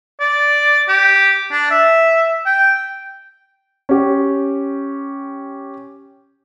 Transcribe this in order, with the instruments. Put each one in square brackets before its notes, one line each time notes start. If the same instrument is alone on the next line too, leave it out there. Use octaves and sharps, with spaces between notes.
[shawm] D5
G4
D4
E5
G5
[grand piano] C#4 G4